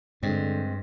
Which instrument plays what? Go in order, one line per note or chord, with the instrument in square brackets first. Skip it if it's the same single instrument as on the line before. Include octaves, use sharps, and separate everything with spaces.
[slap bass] G2 [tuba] D3 [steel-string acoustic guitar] G#3 C4